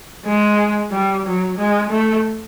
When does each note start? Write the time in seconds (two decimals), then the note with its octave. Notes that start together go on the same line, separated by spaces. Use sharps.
0.25 G#3
0.91 G3
1.25 F#3
1.58 G#3
1.90 A3